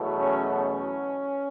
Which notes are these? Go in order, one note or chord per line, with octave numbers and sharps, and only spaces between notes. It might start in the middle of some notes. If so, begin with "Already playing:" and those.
Already playing: E2 B2 F#3 A3
C#4
C#4